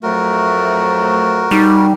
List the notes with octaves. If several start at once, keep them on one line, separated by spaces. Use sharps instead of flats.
F2 F#3 A3 F#4 A#4
G3 D#4